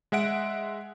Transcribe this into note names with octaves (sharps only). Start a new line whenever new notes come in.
G#3 E5 F#5 D7